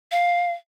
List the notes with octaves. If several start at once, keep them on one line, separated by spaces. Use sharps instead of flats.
F5